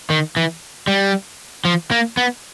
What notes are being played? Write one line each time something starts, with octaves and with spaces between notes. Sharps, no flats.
D#3
E3
G3
F3
A#3
B3